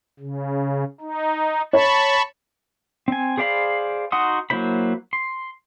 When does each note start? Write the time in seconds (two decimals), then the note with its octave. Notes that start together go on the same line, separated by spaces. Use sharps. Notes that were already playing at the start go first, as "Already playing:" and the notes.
0.19 C#3
1.01 D#4
1.73 C#5 A5 B5 C#6
3.08 C4 G#5
3.37 G#4 C5 D5 F5 B5
4.12 D#4 F#4 F#5 C6 D#6
4.50 F#3 A#3 E4 C5 B5
5.13 C6